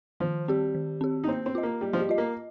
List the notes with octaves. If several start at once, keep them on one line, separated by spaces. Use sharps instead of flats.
D#3 F3
G3 C4 G4
D#3
C4 G4
D#4
A#3 C4
C4
F4 D#5
A#3
G3 A#3
F3
G3
F4 D#5
A#3